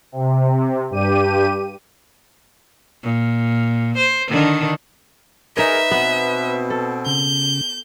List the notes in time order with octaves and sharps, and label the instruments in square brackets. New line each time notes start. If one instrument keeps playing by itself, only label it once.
[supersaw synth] C3
G2 G4 D#7
[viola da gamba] A#2
C5
D3 D#3 D4
[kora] D#4 C#5 [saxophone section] G#4 A#4 [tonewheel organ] B4 [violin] E5
[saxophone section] B2 C4 [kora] B3
[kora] A4
[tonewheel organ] C#3 [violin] G6